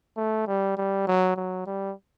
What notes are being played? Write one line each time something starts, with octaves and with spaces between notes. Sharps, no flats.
A3
G3
G3
F#3
F#3
G3